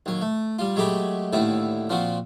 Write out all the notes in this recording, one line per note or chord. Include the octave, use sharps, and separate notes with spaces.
D#2 F#3
A3
G3 F4
F#3 G#3 A3 G4 B5
D#2 A2 D3 E4
A#2 F3 C4 F#4